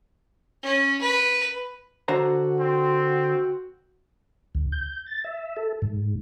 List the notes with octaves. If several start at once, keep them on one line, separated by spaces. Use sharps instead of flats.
C#4
B4
D3 F#4 C5 A#5
C4
D2
G6
A6
E5
A4
G#2